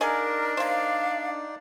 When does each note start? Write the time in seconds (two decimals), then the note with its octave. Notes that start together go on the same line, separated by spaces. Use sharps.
0.01 D4 D#4 G#4 A#4 D5 D#5 F5
0.57 A#3 C5 F5